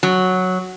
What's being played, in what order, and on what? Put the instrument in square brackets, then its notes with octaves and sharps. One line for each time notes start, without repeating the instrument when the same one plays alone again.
[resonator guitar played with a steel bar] F#3